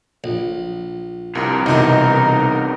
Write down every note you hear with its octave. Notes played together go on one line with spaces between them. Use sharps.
A#1
C2 G2 C3 A#4
C2 B2 E3 D#4